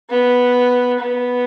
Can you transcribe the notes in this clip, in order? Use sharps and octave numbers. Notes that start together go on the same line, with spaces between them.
B3
B3